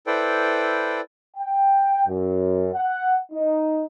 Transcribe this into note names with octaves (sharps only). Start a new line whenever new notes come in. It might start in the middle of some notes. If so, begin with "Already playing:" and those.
E4 A4 B4 C5 D5 G5
G5
F#2
F#5
D#4